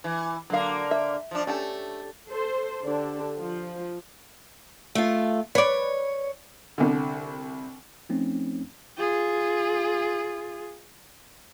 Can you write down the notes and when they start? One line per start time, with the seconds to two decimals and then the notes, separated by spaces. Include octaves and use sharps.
0.04 E3
0.50 D3 F#3 A#3 F5
0.91 E5
1.31 F3 D4
1.47 A3 C#4 G4 A5
2.28 A4 C5
2.83 D3 D4 G4
3.38 F3
4.95 A3 F4
5.55 B4 C#5 D5
6.78 C2 D3
8.09 F3 A3 C4 C#4 D#4
8.97 F4 G#4